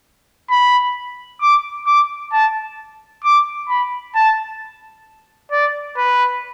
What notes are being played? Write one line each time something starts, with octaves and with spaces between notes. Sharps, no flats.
B5
D6
D6
A5
D6
B5
A5
D5
B4